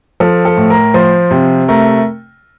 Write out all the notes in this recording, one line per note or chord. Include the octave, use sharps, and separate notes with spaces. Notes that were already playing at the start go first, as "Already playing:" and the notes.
F3 A4
A4
A2
A#4
F3 C5
C3
A3 A#4